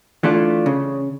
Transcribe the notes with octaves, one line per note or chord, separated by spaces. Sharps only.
E3 A3 D4 F4
C#3